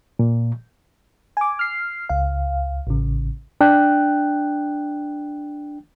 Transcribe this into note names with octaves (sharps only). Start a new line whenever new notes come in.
A#2
G#5 D6
F6 C7
C#2 F5
A1 C#3
D4 G5 F#6